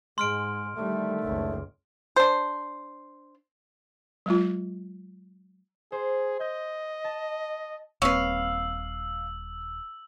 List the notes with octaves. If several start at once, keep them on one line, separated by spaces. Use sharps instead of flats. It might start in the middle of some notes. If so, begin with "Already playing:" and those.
G#2 G#3 C6 F6 D7
D3 D#3 G3 A3
F#1 C#2
D4 C5
F#3 G#3 F4
G#4 C5
D#5 G6
A5
D#1 A#3 C4 B4 C#5 F5 E6